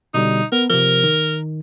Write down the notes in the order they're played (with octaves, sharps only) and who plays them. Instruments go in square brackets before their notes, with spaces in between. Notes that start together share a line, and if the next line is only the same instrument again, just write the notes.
[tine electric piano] B2 D3 G3 [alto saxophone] D#4
[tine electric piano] B3 [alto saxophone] A#4
[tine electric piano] C3 F3 [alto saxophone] A#4
[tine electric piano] D#3